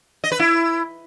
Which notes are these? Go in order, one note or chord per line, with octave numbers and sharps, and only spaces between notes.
D#5
B4
E4